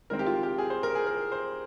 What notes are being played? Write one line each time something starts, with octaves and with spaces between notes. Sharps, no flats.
D#3 G#3 C4 A#4
G4
F4
G4
G#4
C5
A#4
G#4
A#4
C5